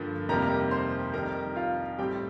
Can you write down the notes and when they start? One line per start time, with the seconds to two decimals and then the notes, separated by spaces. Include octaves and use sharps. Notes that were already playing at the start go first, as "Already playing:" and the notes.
Already playing: G2 D3 F3 A#3
0.29 F2 C3 D#3 G3 A#3 A#4 A#5
0.71 C5 C6
1.14 F2 D#3 G3 A#4 A#5
1.56 F4 F5
1.98 A2 G3 C4 G4 G5